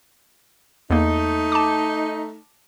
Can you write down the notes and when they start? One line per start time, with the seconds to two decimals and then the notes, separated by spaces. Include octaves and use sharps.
0.90 E2 A3 A#3 D#4
1.52 A5 D6